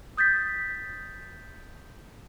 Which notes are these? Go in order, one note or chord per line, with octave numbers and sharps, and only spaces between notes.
D#6 G6 A6 B6